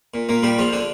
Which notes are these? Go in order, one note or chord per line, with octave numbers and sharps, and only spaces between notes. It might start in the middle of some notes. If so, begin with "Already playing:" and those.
A#2
A#2 A#3
A#2 G3 G4
A#1 F3 F4
D3 D4